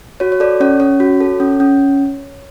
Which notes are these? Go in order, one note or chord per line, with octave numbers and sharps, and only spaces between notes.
F#4 C#5
C#5
A4 D5
C#4 C#5
C#4 C#5
F#4
A4
C#4
C#4